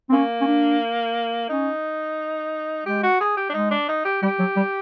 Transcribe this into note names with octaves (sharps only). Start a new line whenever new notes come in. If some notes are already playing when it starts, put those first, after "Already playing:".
C4
A#3 C#4
C#4
D4
C#4 D#4
G#3 G4
F#4
G#4
G4
D4
G#3 D#4
D4
D#4
G4
G3 G4
F#3
G3